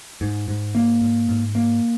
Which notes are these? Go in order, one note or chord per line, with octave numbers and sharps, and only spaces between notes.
G#2
G#2
A#3
G#2
G#2
A#3